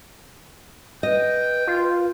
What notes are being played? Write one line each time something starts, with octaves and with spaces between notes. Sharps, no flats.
B4 D#5 G5
F4